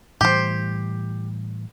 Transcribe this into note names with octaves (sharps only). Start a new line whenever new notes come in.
A2 E3 G3 G4 C5